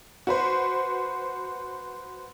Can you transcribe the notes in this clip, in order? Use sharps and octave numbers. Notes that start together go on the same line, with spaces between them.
F#4 B4 C5